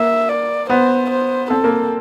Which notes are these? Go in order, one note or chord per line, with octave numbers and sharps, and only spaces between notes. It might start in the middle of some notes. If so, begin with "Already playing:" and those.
Already playing: A#3 E5
D5
B3 C5
C5
C4 A4
A#3